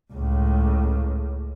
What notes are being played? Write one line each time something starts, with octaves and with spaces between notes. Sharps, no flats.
C#2 A2